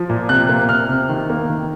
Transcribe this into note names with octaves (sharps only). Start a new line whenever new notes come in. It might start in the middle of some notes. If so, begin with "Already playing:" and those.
Already playing: F3
A#2
C3 F#6
A#3
C3 F6
C3
D#3
A#3
D#3